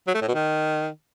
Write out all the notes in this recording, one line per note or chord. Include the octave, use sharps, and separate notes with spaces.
F#3
A3
A2
B2
D#3